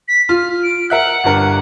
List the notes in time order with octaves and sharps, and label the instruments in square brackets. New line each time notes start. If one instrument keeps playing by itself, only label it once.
[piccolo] B6
[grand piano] F4 [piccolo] F6
[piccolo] D7
[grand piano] A#4 E5 F#6 [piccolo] F#5
[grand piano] G1 G2 A#4